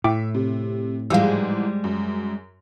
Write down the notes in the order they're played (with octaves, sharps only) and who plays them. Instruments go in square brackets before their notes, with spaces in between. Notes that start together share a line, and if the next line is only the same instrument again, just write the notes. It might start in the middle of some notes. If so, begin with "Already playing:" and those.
[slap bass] A2 [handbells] E4 G5 D6 [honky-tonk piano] E5
[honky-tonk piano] C3
[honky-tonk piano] G#2 E3 F3 [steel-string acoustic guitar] G3 G#3 [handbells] F5 E6
[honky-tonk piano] F#2